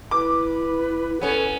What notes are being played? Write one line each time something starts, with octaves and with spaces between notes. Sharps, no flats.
E4 B4 D6
B3 C#4 A4